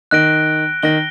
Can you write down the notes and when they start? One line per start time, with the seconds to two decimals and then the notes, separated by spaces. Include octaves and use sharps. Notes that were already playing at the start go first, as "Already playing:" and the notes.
0.11 D#3 F#6 A#6 D7 G7
0.83 D#3 F#6 A#6 D7 G7